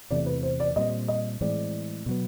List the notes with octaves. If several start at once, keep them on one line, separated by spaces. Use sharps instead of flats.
E2 C3 E3 A3 D5
B4
C5
D5
A#2 G3 C4 D#5
D#5
A2 E3 G#3 C4 D5
B2 F#3 B3